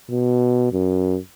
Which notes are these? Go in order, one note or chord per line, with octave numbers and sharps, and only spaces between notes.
B2
F#2